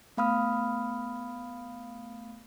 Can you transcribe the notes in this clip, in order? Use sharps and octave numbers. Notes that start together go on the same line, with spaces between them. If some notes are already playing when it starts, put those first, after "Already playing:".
A3 B3 F5 B5 D#6 F6